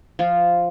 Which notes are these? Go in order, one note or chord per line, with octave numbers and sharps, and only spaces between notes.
F3 F4